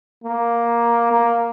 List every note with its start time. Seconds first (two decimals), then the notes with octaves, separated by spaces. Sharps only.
0.24 A#3
1.11 A#3